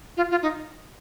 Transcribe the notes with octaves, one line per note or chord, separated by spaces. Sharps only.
F4
F4
D#4